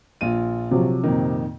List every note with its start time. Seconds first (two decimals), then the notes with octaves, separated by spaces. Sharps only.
0.21 A#1 F4 D#7
0.71 C3 F3 F#3
1.04 F2 A#2 D#3